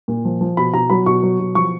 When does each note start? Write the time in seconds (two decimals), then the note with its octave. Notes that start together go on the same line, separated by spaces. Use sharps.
0.08 A#2
0.25 F3
0.41 F3
0.57 B2 B5
0.74 B2 A#5
0.90 F#3 B5
1.06 B2 C#6
1.23 F#3
1.40 B2
1.55 F3 C#6